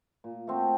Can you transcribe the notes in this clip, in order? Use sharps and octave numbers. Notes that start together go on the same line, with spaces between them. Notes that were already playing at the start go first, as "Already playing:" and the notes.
A#2
A3 C4 F#4